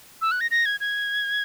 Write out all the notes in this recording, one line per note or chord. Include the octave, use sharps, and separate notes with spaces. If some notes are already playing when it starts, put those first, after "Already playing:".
E6
F#6
A#6
A#6
G#6
G#6